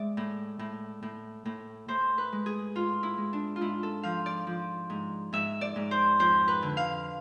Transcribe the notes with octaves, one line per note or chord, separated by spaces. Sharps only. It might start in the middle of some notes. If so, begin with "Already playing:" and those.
Already playing: G#3 D5 E5
A2
A2
A2
A2
A2 C5
B4
G#3
G#4
G#2 F4
E4
G#3
D4
F4
G#2 E4
A4
F3 F5
D5
F3
G#2
G#2 E5
D5
G#2
C5
F2 C5
B4
D3
F5